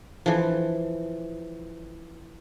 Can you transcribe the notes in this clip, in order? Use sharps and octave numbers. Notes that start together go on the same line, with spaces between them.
E3 F3